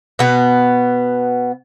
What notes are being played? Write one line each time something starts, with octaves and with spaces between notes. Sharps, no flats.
B2 B3